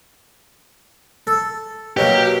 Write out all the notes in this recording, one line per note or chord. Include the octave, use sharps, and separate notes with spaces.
A4
B2 F#3 A#3 G4